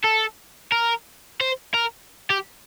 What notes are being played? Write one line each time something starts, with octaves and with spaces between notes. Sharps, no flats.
A4
A#4
C5
A#4
G4